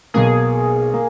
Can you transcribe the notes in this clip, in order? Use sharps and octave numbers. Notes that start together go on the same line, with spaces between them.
B1 B2 A#3 G#4
A#3